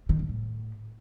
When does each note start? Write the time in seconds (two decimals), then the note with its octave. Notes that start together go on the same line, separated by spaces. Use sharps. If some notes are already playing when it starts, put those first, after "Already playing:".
0.09 D#3
0.19 G#2
0.29 A2